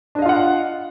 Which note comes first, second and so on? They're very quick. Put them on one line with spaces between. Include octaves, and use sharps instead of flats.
D4 D#5 F5 F4 F#5